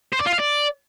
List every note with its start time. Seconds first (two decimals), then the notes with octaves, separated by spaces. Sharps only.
0.13 C5
0.20 D5
0.26 F4
0.33 F5
0.40 D5